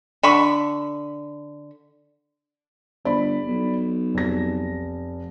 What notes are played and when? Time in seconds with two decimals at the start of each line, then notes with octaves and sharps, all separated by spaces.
0.23 D3 B5 C#6
3.05 G1 D5 B5
3.48 B1
4.15 F1 A#6